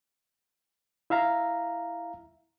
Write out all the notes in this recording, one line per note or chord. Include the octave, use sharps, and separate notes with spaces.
E4 E5 F5 A#5